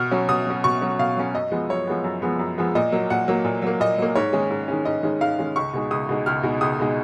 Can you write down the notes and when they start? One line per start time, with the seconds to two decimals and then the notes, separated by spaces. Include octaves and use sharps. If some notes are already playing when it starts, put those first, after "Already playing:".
Already playing: B2 F6
0.11 F#3 C#4
0.29 B2 D#6
0.46 F#3 C#4
0.64 B2 C#6
0.81 F#3 C#4
0.99 B2 F5
1.17 F#3 C#4
1.34 F#2 D#5
1.52 F3 G#3 B3
1.70 F#2 C#5
1.87 F3 G#3 B3
2.04 F#2
2.22 F3 G#3 B3
2.39 F#2
2.58 F3 G#3 B3
2.75 A#2 D#5
2.92 F#3 A#3
3.10 A#2 F#5
3.28 F#3 A#3
3.45 A#2
3.62 F#3 A#3
3.80 A#2 D#5
3.98 F#3 A#3
4.15 G#2 C#5
4.33 D#3 G#3 C#4
4.50 G#2
4.68 D#3 G#3 C#4
4.85 G#2 D#5
5.03 D#3 G#3 C#4
5.21 G#2 F5
5.39 D#3 G#3 C#4
5.56 C#2 C#6
5.73 B2 G#3 D#4
5.91 C#2 D#6
6.09 B2 G#3 D#4
6.26 C#2 F6
6.43 B2 G#3 D#4
6.61 C#2 D#6
6.79 B2 G#3 D#4